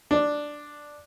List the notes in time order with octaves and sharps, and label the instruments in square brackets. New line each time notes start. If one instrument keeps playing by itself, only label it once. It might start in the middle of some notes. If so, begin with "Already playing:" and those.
[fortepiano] D4